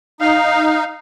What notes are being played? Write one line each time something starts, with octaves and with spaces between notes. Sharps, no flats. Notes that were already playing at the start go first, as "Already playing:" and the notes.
D#4 F5